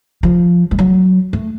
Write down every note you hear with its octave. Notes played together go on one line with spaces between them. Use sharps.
F3
G#3
F#3
A3